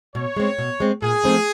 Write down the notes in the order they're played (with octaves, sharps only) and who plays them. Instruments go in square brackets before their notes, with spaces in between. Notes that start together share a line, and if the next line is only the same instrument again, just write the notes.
[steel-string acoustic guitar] B2 [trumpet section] C#5
[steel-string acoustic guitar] G#3 C4
B2
G#3 C4
[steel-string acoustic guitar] A#2 [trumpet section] G#4
[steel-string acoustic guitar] F3 A3 C4 D#4